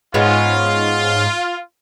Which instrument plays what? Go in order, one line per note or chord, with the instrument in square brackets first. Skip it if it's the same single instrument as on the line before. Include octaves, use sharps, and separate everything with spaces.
[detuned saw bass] G#2 [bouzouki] G#3 B3 C#4 [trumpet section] F4